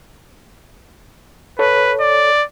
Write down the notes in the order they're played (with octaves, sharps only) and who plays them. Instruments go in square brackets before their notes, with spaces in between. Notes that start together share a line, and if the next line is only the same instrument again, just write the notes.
[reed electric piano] A4 C#5 [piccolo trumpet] B4
[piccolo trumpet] D5